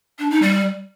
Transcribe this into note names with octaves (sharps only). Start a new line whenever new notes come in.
D4
D#4
G3